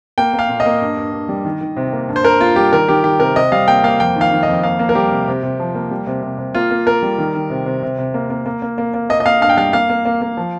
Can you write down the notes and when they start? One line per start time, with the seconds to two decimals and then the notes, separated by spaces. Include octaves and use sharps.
0.18 A#3 G5
0.34 A#3
0.39 F5
0.49 A#2
0.60 D#5
0.66 A#3
0.82 G2
0.97 G2
1.13 G2
1.29 G3
1.45 D#3
1.61 D#3
1.77 C3
1.93 A#3
2.09 G2
2.16 C5
2.24 G2 A#4
2.40 A#3 F4
2.56 G3 G4
2.73 D#3 A#4
2.88 D#3 G4
3.04 D#3 G4
3.20 C3 A#4
3.36 C3 D#5
3.52 G3 F5
3.67 A#3 G5
3.84 A#3 F5
4.00 F2 G5
4.16 D#3 F5
4.32 D#3
4.43 F2 D#5
4.63 A#3 F5
4.79 A#3
4.89 A#4
4.95 G3 G4
5.11 C3
5.28 C3
5.43 C3
5.60 F3
5.75 A#3
5.91 G3
6.07 C3
6.23 C3
6.38 C3
6.55 A#3 F4
6.71 A#3
6.87 A#3 A#4
7.02 G3
7.18 D#3
7.35 D#3
7.50 C3
7.66 C3
7.83 C3
7.98 C3
8.14 A#3
8.30 A#3
8.46 A#3
8.62 A#3
8.78 A#3
8.94 A#3
9.10 A#3 D#5
9.20 D#5
9.25 A#3 F5
9.41 G2 F5
9.49 G5
9.57 G3 F5
9.73 A#3 F5
9.89 A#3
10.05 A#3
10.22 A#3
10.37 F3